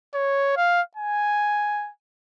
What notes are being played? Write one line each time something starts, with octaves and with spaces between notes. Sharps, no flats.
C#5
F5
G#5